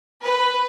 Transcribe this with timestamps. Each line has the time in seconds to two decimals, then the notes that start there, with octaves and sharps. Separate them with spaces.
0.24 B4